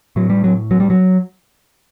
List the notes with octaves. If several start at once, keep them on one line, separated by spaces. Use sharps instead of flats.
A2 F#3
G3
F#3
F#3
G3
F#3